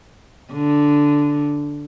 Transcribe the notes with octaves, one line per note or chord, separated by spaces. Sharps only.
D3